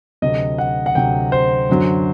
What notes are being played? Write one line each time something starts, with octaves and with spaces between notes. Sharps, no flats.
D2 C3 F#3 D#5
F#5
F#5
D2 C3 F#3 G5
C5
F#2 D3 F#3